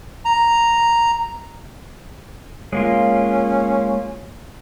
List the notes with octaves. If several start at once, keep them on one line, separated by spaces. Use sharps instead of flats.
A#5
G#3 A#3 C#4 F4